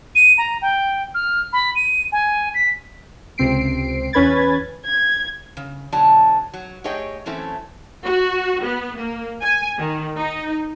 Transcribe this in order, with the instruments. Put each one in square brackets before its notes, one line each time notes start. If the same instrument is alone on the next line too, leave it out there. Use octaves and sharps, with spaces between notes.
[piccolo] D#7
A#5
G5
F6
B5
D#7
G#5
B6
[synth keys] C#2 C3 C4 C7 D7
E2 C#4 B4 B5 G#6 A6
[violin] G#6
[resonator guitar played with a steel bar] C#3
B2 D3 F#3 D5 A5
F#3
A3 G4 G#4 C#5 D#5 G5
E3 F#3 A3 C4 C#4 E4
[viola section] F#4
B3
A#3
G#5
D#3
D#4